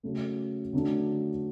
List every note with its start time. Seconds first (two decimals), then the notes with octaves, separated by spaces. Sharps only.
0.03 C#3 F#3 A3
0.73 D3 F#3 A3 D4